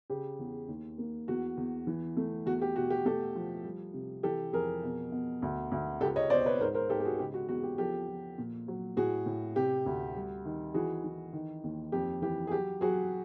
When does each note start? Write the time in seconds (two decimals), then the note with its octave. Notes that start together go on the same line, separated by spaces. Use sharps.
0.10 C#3 G4
0.39 E2
0.68 D#2
0.98 A#3
1.28 E2 F#4
1.57 E2
1.87 E3
2.17 A3
2.46 E2 F#4
2.62 G4
2.76 B2 F#4
2.90 G4
3.05 A3 G4 A4
3.35 F3
3.64 G3
3.94 C3
4.23 E3 G4 A4
4.53 F2 G#4 A#4
4.83 B2
5.12 B2
5.42 D2
5.71 D2
6.01 C#2 G4 A4
6.16 C#5 D#5
6.30 B2 C5 D5
6.46 B4 C#5
6.60 G#2 A#4 C5
6.74 A#4 C5
6.89 G#2 G4 A4
7.00 G4
7.04 F#4 G#4
7.19 C#3 G4
7.34 F#4
7.48 E2 F#4
7.63 G4
7.78 F3 G4 A4
8.08 F3
8.38 A#2
8.68 F#3
8.97 A2 F#4 G#4
9.26 A2
9.56 C3 G4
9.86 D2
10.15 G3
10.45 D#3
10.74 E3 F#4 G#4
11.04 E3
11.33 D#3
11.64 D#2
11.92 F2 G4
12.22 E3 G4
12.47 G#4
12.51 F#3 G4
12.81 F#3 F#4 G#4